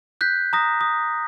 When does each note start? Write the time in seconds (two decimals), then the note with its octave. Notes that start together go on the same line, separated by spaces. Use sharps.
0.21 F#6 G6 B6
0.53 A#5 D#6 A#6
0.81 D#6